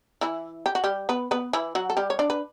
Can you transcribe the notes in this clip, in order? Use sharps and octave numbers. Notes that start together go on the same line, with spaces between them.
E3 E4
G4
F#4
G3 G4
B3 B4
B3 B4
E3 E4
F#3 F#4
A4
G3 G4
C#5
D4 D5
B4